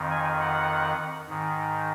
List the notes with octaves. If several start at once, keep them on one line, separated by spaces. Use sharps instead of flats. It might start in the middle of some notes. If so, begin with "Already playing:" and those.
Already playing: F2 D#3
G#5
F#5
G#2 D#3